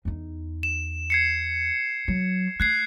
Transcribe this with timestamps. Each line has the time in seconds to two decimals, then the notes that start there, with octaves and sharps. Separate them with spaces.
0.05 E2 D#4
0.63 E7
1.10 G#6 C7 C#7
2.08 F#3
2.60 A3 F#6 G#6 C7